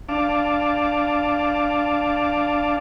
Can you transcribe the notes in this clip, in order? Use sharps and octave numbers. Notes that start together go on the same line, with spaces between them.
D4 F5 A5 D6